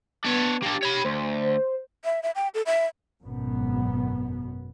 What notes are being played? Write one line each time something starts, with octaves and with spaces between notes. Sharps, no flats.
B3 D4 C#5
A#3 D4 G4
C#5 B5
D2 C5
E5
E5
G5
A4
E5
G#1 F#2 B2 B3